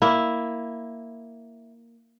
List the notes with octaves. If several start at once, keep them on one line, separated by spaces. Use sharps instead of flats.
A#3 E4